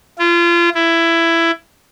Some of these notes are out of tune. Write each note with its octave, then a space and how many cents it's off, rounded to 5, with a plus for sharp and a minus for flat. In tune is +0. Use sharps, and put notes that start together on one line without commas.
F4 -30
E4 +15